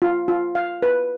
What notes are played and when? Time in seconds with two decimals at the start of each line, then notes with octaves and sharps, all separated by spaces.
0.02 F4
0.28 F4
0.55 F5
0.82 B4